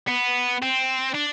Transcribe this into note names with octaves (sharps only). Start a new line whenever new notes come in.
B3
C4
D4